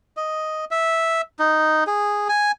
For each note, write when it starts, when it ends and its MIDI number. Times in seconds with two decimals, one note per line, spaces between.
0.17 0.65 75
0.71 1.21 76
1.39 1.84 63
1.87 2.28 68
2.29 2.52 80